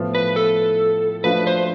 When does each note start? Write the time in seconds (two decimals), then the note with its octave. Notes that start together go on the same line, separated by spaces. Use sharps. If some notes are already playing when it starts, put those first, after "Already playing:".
Already playing: A2 F3 B3 F4
0.15 B4
0.36 A4
1.24 F3 A3 D4 F4 B4
1.47 C5